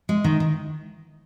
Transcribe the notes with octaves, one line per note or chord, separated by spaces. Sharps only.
G#3
D#3
D#3